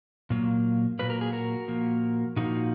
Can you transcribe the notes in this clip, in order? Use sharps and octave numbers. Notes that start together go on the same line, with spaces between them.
A#2 F#3 A#3
A#2 F#3 A#3 B4
A#4
G#4
F#4 A#4
A#2 F3 A#3
A#2 F3 A#3 D#4 F#4